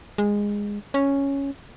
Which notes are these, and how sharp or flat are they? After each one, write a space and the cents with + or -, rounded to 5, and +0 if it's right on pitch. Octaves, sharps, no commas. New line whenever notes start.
G#3 -15
C#4 +0